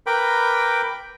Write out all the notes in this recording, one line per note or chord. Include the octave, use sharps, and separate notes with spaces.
A#4 B4 G5 B5 D6